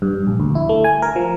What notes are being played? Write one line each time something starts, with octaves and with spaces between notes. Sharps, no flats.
G2
A#1
D2
E4
A3
G#5
A#4
F3